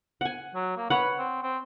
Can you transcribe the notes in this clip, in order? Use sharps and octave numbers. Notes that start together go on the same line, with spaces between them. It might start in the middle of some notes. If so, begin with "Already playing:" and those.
F#5 G#5
F#3
A#3
B4 C#5 F#5
C4
C4